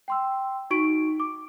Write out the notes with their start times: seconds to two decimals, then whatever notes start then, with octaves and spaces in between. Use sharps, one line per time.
0.08 G5 C6 E6
0.70 D#4 F#4 C#6 D7
1.20 D6